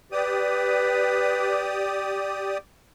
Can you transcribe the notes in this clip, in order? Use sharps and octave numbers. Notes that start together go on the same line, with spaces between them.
G4 B4 D5 D#6